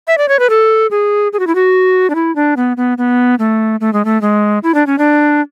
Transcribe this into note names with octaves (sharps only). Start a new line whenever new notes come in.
E5
D5
C#5
B4
A4
G#4
G#4
F#4
E4
F#4
D4
E4
D4
B3
B3
B3
A3
A3
G#3
A3
G#3
E4
D4
C#4
D4